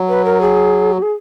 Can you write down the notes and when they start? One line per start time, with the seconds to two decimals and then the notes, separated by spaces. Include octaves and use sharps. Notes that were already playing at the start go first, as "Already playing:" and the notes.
Already playing: F#3
0.08 B4
0.25 A#4
0.41 G#4
0.93 F#4
1.02 G#4